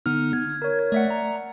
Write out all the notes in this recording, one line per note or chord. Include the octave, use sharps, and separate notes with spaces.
D3 B3 D#4 F6
G#6
A#4 C#5
A3 D5 E5 F#5
A#5